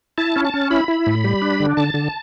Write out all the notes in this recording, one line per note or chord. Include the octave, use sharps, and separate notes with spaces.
E4 A5
C#4
A5
C#4
E4 B5
E4
A2
G3
D4
D3
D3 A5
D3